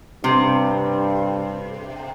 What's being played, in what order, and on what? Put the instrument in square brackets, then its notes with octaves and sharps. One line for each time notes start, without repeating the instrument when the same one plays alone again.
[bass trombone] G2 [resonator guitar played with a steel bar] C3